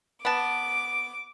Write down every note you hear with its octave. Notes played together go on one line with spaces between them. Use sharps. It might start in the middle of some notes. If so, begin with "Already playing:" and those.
B3 A5 D6